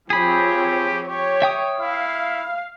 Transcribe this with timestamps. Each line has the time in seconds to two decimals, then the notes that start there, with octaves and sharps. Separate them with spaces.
0.10 F3 C4 G4 G#4 C#5 B5
1.08 G4 C#5
1.42 E5 G5 D#6
1.80 E4 F5